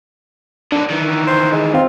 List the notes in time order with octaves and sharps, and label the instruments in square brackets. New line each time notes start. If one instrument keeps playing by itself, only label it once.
[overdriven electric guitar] D3 F#3 [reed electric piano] D4
[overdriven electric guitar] D#3 E3
[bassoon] C5
G#3
[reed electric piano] C4 [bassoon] F4